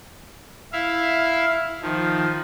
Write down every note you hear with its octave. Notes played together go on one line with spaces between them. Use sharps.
E4 E5 F5
D#3 F3